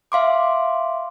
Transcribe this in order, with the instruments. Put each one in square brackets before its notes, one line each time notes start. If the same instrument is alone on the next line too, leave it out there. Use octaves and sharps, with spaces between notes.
[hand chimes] E5 F5 C6 D6